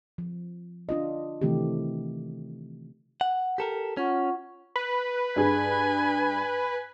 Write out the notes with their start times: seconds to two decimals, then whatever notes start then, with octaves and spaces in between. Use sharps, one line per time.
0.18 F3
0.89 D4 F4 D#5
1.42 C3 D#3 E3 A3 C4 G4
3.21 F#5
3.58 G4 A4 A#4
3.97 C#4 F4 F#5 C#6
4.76 B4
5.36 G2 G#4 G#5